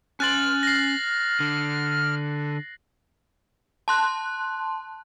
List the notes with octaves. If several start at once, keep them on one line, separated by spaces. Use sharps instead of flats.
C#4 C6 F6 F#6 A6 F#7
A#6 C7
D3
A5 C6 F#6